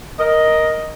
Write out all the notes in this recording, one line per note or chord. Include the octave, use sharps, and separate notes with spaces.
A#4 D#5